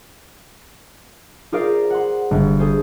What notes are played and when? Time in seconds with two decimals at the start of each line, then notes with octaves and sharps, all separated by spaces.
1.52 F4 G#4 A#4 C5 D5 F5
1.90 F#5 C6
2.31 G1
2.59 G#4 A4 C5